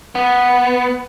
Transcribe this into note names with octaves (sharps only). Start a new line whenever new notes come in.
B3